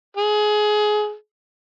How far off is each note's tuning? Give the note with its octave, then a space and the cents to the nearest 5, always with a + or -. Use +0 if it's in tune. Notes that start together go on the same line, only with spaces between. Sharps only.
G#4 +20